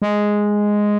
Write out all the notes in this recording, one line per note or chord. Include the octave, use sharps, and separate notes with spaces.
G#3